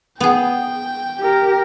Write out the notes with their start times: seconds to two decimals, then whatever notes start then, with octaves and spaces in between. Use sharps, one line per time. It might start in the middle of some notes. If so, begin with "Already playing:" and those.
0.20 B3 G#4 G5
1.20 G4 A#4